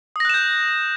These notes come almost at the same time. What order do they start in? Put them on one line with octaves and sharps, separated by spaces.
D#6 A#6 F#6 E7 G6